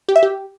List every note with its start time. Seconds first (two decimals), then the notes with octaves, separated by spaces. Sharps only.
0.09 G4
0.16 E5
0.23 G4